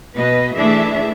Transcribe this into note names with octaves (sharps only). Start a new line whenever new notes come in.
B2 B4 D#5
E3 A3 D4 G#4 E5